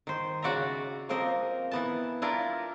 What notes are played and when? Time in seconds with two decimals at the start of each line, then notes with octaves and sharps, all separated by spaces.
0.07 D#3 C5
0.42 C#3 F#4 D5 E5 A#5
1.09 F3 A#3 C4 A#4 C5 D#5
1.71 E3 B3 A5
2.22 D4 E4 F4 A#4